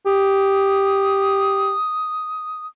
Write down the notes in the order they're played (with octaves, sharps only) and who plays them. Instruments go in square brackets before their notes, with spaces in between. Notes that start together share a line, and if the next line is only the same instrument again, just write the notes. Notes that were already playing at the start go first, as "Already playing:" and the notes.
[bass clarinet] G4 [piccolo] D#6